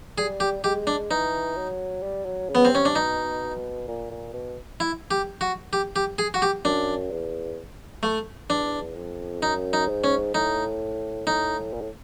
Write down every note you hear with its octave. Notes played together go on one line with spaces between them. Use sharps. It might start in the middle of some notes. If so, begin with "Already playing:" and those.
G3 G#4
G4
G#3 G4
D4
E3 D#4
F#3
G3
F#3
C#3
B3
C4
C3 C#4
D4
B2 D#4
A#2
A#2
B2
E4
G4
F#4
G4
G4
G#4
F#4
G4
F#2 D4
E2
A3
E2 D4
F2
F#2 D#4
D#4
G#2
C#4
A2 D#4
A2 D#4
A#2
A2